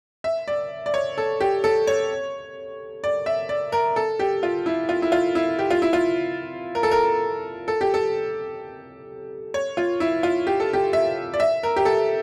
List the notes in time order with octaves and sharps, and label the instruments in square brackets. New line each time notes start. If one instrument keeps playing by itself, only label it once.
[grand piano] E5
D5
D5
C#5
A4
G4
A4
C#5
D5
E5
D5
A#4
A4
G4
F4
E4
F4
E4
F4
E4
G4
F4
E4
F4
A#4
A4
A#4
A4
G4
A4
C#5
F4
E4
F4
G4
A4
G4
E5
D5
E5
A#4
G4
A4